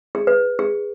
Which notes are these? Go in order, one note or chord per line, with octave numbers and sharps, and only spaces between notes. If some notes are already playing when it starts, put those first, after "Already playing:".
G#4
B4
G#4